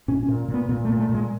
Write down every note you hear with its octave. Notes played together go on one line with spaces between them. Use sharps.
A#2 C#4
C#4
A#2
A#2
B3
A#2 B3
A3
A#2
A3
A#2
G#3